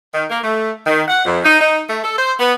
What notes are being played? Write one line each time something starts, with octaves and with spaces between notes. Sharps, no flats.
D#3
A#3
A3
D#3
F#5
F2
D#4
D#4
A3
A4
C5
B3